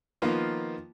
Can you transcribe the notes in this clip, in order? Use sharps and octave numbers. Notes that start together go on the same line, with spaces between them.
D#3 F3 A#3 B3 F4